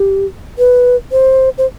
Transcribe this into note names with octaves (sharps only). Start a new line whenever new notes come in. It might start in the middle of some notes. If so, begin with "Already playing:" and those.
Already playing: G4
B4
C5
C5